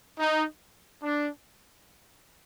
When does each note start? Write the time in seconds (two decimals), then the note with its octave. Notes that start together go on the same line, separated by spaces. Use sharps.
0.19 D#4
1.02 D4